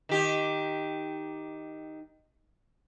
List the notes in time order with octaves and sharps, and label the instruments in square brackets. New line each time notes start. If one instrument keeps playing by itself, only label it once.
[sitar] D#3 G4